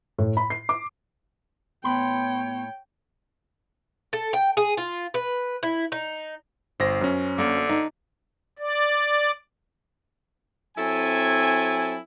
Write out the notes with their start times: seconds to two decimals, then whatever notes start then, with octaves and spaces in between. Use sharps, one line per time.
0.18 A2
0.37 B5
0.50 C7
0.69 D6
1.84 A2 B3 C#5 G5 B5 C6
4.13 A4
4.33 G5
4.57 G#4
4.77 F4
5.14 B4
5.63 E4
5.92 D#4
6.80 G1 C5 A#6
7.01 F#2 C#4
7.38 D3 A#3
7.69 D#4
8.59 D5
10.78 F#3 C4 E4 A4 G#5